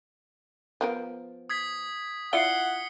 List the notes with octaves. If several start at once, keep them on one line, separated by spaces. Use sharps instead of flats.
F3 B3 A#4
D#6 G#6 B6
E4 F4 D5 F#5 C7 C#7 G7